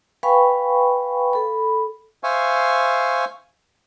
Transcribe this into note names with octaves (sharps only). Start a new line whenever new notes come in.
B4 F5 G5 G#5 B5 C#6
A4 B5
C5 E5 F5 G#5 C#6